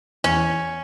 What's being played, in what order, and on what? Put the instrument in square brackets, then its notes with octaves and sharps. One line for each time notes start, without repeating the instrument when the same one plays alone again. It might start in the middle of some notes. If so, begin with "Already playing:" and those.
[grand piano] E2 [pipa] C#4